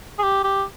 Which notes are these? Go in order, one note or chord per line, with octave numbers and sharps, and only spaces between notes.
G#4
G4
G4